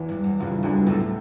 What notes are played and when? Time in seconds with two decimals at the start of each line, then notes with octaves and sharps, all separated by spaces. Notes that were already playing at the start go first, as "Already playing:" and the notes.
Already playing: E2 E3
0.09 G2
0.24 F#2
0.40 C#2 G2 C#3
0.56 E3
0.63 D2 G2 D3
0.83 B3
0.86 F#2 A2 A3